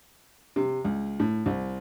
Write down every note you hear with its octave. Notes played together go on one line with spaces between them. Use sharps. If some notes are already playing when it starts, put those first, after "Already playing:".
C3
C#2
A2
C2